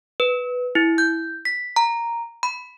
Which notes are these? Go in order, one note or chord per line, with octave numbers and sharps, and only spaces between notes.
B4
E4
G6
B6
A#5
B5